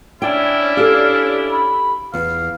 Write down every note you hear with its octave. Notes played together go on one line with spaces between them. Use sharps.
C#4 D4 E4 G5
G4 A4 F5
B5
E2 F5